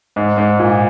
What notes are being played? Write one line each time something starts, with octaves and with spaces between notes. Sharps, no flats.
G#2
G#2
A#2